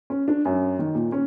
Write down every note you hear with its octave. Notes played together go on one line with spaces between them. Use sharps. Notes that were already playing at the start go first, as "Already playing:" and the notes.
C#4
D4
F#2
D#3
A#2
C#4